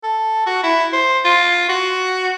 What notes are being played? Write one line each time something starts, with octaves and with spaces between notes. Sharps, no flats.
A4
F#4
E4
C5
F4
F#4